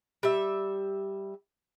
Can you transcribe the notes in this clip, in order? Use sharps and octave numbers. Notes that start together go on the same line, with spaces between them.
G3 E5